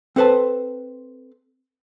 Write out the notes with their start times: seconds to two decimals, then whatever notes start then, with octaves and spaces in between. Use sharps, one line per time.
0.16 C4 A4 B4 C5 A5